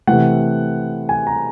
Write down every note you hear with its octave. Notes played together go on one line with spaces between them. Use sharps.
C3 E3 A3 F#5
G#5
A#5